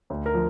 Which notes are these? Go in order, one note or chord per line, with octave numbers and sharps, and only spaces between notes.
D2
A#4
F3